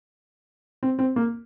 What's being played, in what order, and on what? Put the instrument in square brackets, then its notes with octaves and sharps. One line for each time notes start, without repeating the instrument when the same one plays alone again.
[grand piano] C4
C4
A#3